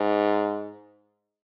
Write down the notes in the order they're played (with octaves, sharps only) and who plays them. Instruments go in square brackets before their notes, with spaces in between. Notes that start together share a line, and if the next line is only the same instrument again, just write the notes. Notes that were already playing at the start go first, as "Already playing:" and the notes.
Already playing: [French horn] G#2